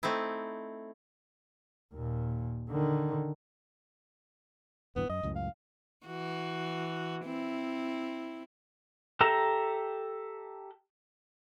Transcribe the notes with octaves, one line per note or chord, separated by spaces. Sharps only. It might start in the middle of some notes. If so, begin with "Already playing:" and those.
A3 C4 D#4 E4
D#2 A#2
D3 D#3
D#1 G2 E3 B3
F#2 D#5
C#2 F#2 A2
F5
E3 F#4
C4 E4
G4 A4 E5 A#5